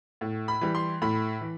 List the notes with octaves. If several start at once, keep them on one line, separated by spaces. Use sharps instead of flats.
A2
B5
E3 G3
C6
A2 B5
E3